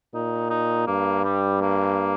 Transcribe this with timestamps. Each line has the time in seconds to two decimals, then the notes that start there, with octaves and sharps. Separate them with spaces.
0.14 A#2 D#4
0.50 D#4
0.87 G2 A#3
1.25 G3
1.62 A#3